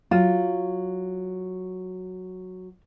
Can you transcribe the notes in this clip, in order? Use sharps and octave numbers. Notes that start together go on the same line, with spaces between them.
F#3 F4